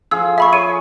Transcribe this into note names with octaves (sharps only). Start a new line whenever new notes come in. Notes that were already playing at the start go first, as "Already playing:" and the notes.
F3 G#4 E6
G#4 E5 B5 C#6
C#5 D#7